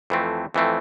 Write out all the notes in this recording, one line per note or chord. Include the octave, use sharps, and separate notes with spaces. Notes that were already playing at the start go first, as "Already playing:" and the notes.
F2 E3 A3 C4
F2 E3 A3 C4